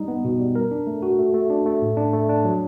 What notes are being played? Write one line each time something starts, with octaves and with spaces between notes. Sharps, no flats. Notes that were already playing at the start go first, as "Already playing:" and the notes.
Already playing: G3 D#4
B3
B2
G3
A#4
D4
A3
F#4
A3
A3
D4
A3
A2
D4
A3
D4
F#3